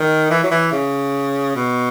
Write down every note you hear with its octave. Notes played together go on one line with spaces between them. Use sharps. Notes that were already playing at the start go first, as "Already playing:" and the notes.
Already playing: D#3
E3
F#3
E3
C#3
B2